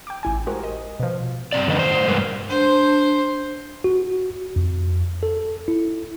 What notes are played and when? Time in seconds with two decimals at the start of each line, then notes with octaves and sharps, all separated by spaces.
0.07 G5 D6
0.23 A1 E4 G#5
0.47 G#3 F#4 G4 A#4 C5
0.63 D#5
1.00 B2 F3
1.52 G2 C#3 C4 D5
1.67 F#2 D3 D#3 B4 D#5
1.79 A2 C5
2.08 G2 G#3 A#4 B4
2.49 D4 C5
3.84 F#4
4.56 F2
5.23 A4
5.68 E4